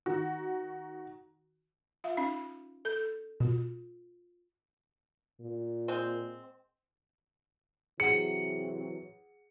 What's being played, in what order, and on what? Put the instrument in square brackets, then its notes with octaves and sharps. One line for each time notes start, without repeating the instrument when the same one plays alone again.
[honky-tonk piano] D#3 F#4
[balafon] F4 E5 F5
C#4 D#4 F5
[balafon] A4 [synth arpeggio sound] G6
[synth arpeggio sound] B2 [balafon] F4
[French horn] A#2
[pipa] G#3 C4
[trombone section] C3 E3 F#3 [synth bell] G#4 F#5 [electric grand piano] C#7